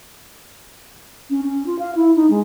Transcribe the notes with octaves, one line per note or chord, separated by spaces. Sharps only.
C#4
C#4
F4
F5
E4
D#4
G#3